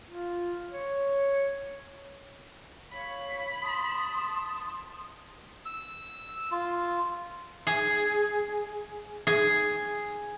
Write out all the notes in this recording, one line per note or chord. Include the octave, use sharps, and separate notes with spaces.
F4
C#5
C#5 F5 B5 C#6
A5 C6 D#6
E6
F4
G#4
G#4